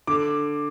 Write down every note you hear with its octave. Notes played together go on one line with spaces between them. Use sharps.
D3 D6